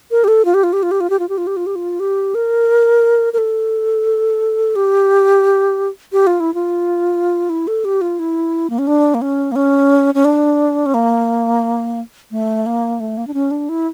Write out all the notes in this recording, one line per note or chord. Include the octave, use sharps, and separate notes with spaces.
A#4
G4
A4
F4
G4
F4
G4
F4
G4
F4
G4
F4
G4
F4
G4
F4
G4
F4
G4
A#4
A#4
A4
G4
G4
F4
E4
F4
E4
A4
G4
F4
E4
A#3
C#4
D4
A#3
C#4
A#3
C#4
C#4
D4
C#4
A#3
A3
A#3
A3
A#3
D4
C#4
D4
E4